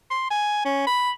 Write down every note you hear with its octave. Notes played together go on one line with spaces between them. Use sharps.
C6
G#5
C#4
B5